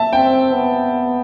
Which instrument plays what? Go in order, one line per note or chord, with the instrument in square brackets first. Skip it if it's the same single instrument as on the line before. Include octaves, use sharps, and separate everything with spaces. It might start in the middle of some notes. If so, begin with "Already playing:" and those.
Already playing: [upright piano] E5 A5
[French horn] C4 [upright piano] G5
[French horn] B3